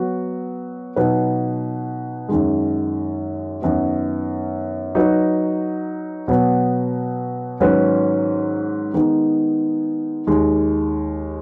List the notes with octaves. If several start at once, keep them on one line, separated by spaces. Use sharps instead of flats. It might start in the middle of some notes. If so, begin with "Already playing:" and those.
Already playing: F#3 B3 F#4
B2 F#3 D#4 B4
F#2 D#3 G#3
F#2 D#3 B3
F#3 D#4 F#4 B4
B2 F#3 B3
G#2 D#3 F#3 C#4 B4
D#3 G#3 B3 D#4
D#2 D#3 G#3